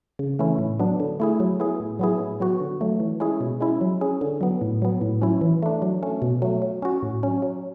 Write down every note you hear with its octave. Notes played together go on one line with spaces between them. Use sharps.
C#3
E3 A3 C#4 E4
A2
F#3 B3 D4
D3
A3 E4 G#4
F#3
B3 E4 G#4
A2
F#3 B3 E4 G#4
A2
F#3 B3 F#4
D3
F#3 A3
E3
G#3 C#4 E4 G#4
B2
G#3 C#4 E4
F#3
C#4 G#4
D3
F#3 B3
A2
F#3 B3
A2
F#3 C#4 E4
E3
A3 D4
F#3
A3 C#4
B2
F#3 A3
F#3
C#4 F#4
A2
F#3 C#4
F#3